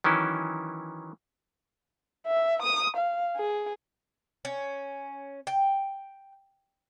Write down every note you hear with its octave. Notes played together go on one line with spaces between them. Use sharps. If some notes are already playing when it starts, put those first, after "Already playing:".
D#3 E3 F#3 C#4 E4
E5
D#6
F5
G#4
C#4
G5